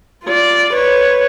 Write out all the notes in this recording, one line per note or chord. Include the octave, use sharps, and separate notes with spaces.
F4 D5
B4 C#5